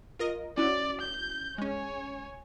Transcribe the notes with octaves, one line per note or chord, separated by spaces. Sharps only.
F4 A#4 D#5
C#4 E4 F#4 D5
G6
G#3 C#4 C#5 G#5